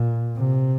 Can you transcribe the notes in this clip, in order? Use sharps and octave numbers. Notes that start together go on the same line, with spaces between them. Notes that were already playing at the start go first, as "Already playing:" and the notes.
Already playing: A#2
C3